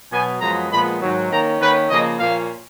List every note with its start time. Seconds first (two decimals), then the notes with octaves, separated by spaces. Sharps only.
0.12 B2 F#3 B3 G#5
0.41 F#2 F3 G#3 B3 A#5
0.72 A#2 F3 G#3 B3 B5
1.01 G#2 D#3 F#3
1.30 D#3 A#3 C#4 A#5
1.60 D#3 A#3 C#4 B4
1.90 C#3 F3 A#3 D#5
2.20 A#2 F3 A#3 C#4 F5